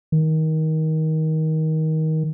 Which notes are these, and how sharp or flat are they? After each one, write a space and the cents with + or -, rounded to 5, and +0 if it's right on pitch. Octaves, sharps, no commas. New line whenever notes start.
D#3 +20